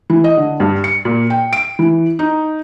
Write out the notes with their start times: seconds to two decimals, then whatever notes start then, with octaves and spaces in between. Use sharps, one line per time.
0.10 E3
0.24 D#5
0.37 D3
0.60 G2
0.84 C#7
1.05 A#2
1.30 G5
1.53 D7
1.79 E3
2.19 D#4